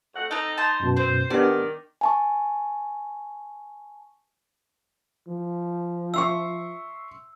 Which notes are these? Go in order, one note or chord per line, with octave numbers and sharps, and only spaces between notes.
F2 A3 F#5
C4 D#4 A4
C5 A5
F#2 B2
C4 C5
D#3 B3 D4 G4 D5
G#5 A5 C#6
F3
E5 C6 C#6 E6